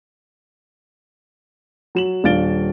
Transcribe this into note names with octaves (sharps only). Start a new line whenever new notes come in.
F#3 E7 F#7
D#1 D4 F5 A6 D7 G7